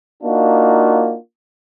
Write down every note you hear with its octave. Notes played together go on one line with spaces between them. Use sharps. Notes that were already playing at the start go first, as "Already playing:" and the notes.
A#3 D4 D#4 F4 F#4